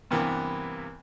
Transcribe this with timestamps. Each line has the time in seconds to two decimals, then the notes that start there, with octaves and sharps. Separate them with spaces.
0.11 G2 C3 E3 A#3 B3